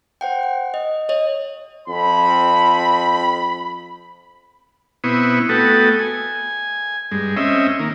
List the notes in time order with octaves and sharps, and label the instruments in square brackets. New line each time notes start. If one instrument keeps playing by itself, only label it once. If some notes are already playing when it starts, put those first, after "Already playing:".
[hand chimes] C5 F#5 G5
F#5
D#5
C#5 D#5
[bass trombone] F2 [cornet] B5
[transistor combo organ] B2 B3 C4 E4 C#6 D#6
A3 B3 F#4 A4 G5 D#6
G#5
G2 G#3
C4 C#4 D#5 E5
D#3 A#3